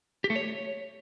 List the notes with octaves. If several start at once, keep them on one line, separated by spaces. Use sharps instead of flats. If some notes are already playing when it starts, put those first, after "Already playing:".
G4
A3
C#5